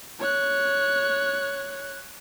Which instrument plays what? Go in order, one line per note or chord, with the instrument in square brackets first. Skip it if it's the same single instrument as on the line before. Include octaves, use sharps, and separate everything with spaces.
[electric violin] C#5 F#6